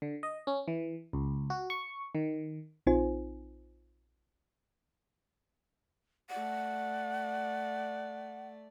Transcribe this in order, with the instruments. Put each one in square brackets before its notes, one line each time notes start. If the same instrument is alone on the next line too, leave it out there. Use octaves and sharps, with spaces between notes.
[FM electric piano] D3
D#5
C#4
E3
C#2
F#4
C#6
D#3
[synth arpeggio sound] A#1 C4 D#4 F4 C5 G#5
[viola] A3 D5 [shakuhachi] F#5